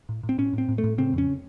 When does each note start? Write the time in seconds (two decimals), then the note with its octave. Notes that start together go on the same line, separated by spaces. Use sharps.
0.09 A2
0.23 A2
0.29 C4
0.38 A2 C#4
0.53 A2 C4
0.69 A2
0.78 A3
0.84 A2
0.98 C#3 C4
1.13 F2 C#4